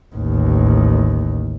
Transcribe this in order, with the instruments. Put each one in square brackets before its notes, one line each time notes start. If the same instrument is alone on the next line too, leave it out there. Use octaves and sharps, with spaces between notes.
[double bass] A1 D#2